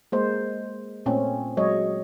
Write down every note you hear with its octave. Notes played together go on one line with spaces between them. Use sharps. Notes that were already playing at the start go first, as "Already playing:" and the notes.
G#3 A#3 C5
A#2 A3 C4 C#4
F#3 G#3 C#5 D#5